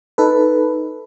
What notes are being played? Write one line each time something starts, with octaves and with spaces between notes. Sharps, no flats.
D#4 A4 B4